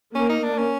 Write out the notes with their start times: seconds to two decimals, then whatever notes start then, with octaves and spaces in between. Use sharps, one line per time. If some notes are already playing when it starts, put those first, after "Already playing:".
0.14 A#3 C#4
0.29 D#4
0.43 D4
0.58 C#4